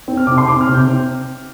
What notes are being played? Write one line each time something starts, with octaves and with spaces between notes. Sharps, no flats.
C4
F6
C3 D6
C6
C4 D6
F6
C3
G6
C4